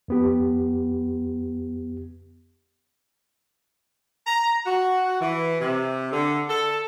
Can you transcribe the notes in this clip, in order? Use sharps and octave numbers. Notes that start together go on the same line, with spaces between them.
F2 B3 G4
A#5
F#4
E3
C3
D3
A4